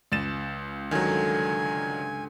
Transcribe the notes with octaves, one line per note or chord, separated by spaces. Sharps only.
C#2 A6 E7
G2 D3 D#3 F#3 G3 G#5